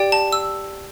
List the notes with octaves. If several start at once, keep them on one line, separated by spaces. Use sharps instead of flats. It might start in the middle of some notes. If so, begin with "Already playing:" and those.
Already playing: G4 D5 G5
A5
E6